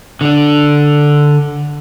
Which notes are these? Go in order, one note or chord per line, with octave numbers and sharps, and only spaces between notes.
D3 D4